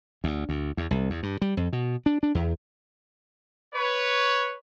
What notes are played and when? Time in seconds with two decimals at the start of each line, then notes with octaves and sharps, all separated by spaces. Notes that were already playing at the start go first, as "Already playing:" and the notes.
0.24 D2
0.49 D2
0.77 E2
0.91 C2
1.10 E2
1.23 G2
1.42 G3
1.57 F2
1.73 B2
2.06 D4
2.23 D4
2.35 E2
3.74 B4 C#5